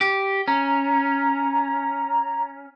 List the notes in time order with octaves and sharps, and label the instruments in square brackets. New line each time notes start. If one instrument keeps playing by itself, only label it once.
[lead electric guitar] G4
[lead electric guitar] C#4 [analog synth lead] A#5